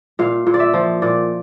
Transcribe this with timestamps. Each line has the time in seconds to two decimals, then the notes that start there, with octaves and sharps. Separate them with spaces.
0.19 A#2 F5
0.47 A#2
0.54 D5
0.60 E5
0.74 F3
1.02 A#2 D5